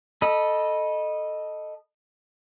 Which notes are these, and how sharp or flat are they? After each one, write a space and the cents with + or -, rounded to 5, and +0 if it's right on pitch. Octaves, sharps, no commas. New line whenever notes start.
A4 +0 D#5 -10 B5 -20